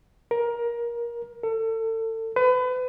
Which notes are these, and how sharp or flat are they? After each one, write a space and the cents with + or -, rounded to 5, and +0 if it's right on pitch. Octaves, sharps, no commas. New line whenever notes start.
A#4 +20
A4 +35
B4 +35